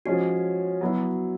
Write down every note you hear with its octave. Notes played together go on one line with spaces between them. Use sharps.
F3 G#3 C#4 F#4
F#3 B3 E4